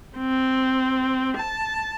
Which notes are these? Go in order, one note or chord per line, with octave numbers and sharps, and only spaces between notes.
C4
A5